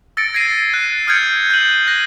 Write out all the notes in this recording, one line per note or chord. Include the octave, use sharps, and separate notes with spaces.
E6 A6 A#6 C#7 D7
G#6 A#6 C7 D#7
F#6
D#6 F6 G6 G#6 C#7 D7
F#6 G6 C7 D#7 F#7
F#6 A#6